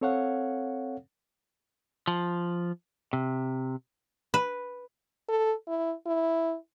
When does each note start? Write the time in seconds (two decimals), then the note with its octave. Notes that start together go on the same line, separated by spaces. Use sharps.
0.01 C4 A4 C#5 F5 F#5
2.08 F3
3.13 C3
4.34 B4
5.29 A4
5.68 E4
6.06 E4